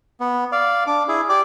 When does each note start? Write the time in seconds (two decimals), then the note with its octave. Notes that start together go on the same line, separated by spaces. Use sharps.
0.20 B3
0.52 D5 F5
0.87 D4 D6
1.08 E4 G#4
1.29 G4 D5 D6